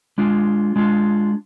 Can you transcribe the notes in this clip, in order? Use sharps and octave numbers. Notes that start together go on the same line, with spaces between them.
G#3 D4 F4
G#3 D4 F4